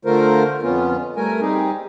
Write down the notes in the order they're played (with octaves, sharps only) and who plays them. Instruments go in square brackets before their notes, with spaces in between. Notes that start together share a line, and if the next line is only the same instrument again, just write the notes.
[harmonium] D3 A3 F4 A#4 C5
F2 B3 C#4 F4
G3 A3 A#4 G#5
G3 C4 D#4 G4 G#4